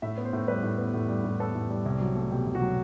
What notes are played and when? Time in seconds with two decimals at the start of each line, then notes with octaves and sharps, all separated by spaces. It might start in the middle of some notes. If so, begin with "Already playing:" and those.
0.02 A2 E5
0.18 B3
0.25 C5
0.33 A2
0.48 G3 B4
0.63 A2
0.78 B3
0.94 A2
1.09 G3
1.24 A2
1.40 B3 A4
1.55 A2
1.70 G3
1.86 C2
2.01 F#3
2.16 A3
2.31 B2 G4
2.47 C2
2.55 F#4
2.62 F#3